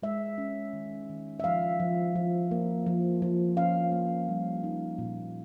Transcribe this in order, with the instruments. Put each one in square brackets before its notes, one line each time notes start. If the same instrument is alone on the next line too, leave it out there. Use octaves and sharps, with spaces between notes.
[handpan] G#3 E5
C#4
D#3
D#3
E5
F3 F5
F3
F3
A#3
F3
F3
C#4 F5
A#3
G3
D#4
A#2